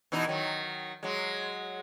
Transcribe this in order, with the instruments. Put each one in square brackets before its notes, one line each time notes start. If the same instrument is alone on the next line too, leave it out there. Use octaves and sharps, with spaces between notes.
[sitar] B2 E3 D#4
D#3 F#3
F#3 G#3